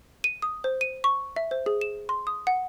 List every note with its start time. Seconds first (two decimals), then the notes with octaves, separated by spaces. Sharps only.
0.24 D#7
0.42 D#6
0.64 C5
0.81 D#7
1.04 C#6
1.36 E5
1.51 C5
1.66 G#4
1.81 E7
2.09 C6
2.27 D#6
2.47 F#5